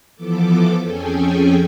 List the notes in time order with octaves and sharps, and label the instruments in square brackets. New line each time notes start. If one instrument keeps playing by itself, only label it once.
[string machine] E3 F3 B3 A4 D6
F2 C#4 G#4 A4 G5 G#5